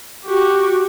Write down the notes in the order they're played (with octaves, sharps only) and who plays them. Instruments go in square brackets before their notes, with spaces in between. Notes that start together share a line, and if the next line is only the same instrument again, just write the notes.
[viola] F#4 G4